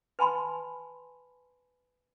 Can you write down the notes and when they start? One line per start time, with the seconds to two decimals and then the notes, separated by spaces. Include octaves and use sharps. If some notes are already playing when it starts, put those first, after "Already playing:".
0.19 B4 G#5 A5 B5 C6